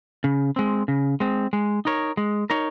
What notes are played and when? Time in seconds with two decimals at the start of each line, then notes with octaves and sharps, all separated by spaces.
0.24 C#3
0.56 G#3 C4
0.88 C#3
1.20 G#3 C4
1.53 G#3
1.85 D#4 A#4 C#5
2.17 G#3
2.50 D#4 A#4 C#5